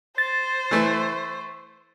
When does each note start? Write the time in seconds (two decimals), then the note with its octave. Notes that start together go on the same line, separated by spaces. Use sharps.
0.18 C5 A6
0.71 E3 A3